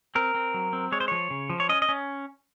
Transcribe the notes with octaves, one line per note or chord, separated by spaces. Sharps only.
C4 A#4
C4
F#3
C4
G#3 C#5
C5
F3 C#5
C#3
F3
C#5
C#4 D#5
D#5
C#4